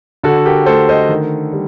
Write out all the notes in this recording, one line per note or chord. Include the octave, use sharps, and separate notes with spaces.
D3 F#4 A4
G4 A#4
A3 A4 C5
C5 D#5
D#3
G3